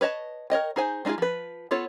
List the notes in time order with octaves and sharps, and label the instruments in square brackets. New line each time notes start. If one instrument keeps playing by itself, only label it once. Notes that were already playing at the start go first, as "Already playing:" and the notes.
[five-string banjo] B4 C#5 D#5 A5
A#4 C#5 D#5 G5
D#4 G#4 C5 G#5
G#3 D4 D#4 F4 G#4
F3 B4
B3 F4 A4 C#5